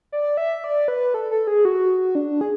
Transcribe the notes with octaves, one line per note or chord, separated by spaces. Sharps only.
D5
E5
D5
B4
A4
A4
G#4
F#4
D4
G#4